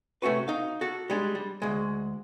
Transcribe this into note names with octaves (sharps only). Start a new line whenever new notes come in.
C3 A3 C#4 F#4 B4
D#4 F5
F#4 A4
G3 G#3 D4
G3
D2 G#3